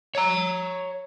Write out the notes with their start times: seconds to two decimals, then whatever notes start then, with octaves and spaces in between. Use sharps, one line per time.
0.15 C#5 A#5